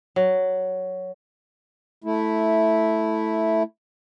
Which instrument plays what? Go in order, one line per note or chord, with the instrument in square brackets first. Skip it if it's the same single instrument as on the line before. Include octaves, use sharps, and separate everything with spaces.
[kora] F#3
[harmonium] A3 E4